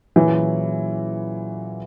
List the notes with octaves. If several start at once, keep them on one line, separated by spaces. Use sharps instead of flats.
A#2 E3 F#3 C#4 E4 G#4